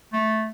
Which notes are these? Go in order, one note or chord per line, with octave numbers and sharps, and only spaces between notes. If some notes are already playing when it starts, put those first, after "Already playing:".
A3